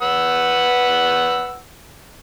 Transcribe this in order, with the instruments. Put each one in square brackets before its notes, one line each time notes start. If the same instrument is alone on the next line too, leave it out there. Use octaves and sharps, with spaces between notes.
[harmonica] B4 F#5 E6